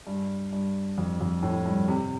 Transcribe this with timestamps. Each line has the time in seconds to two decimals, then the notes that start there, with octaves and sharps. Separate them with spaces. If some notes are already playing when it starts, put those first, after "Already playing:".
0.07 G2
0.53 G2
0.98 F2
1.21 F2
1.43 A2
1.66 G2
1.88 C3